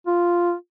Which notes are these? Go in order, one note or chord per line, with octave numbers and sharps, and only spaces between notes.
F4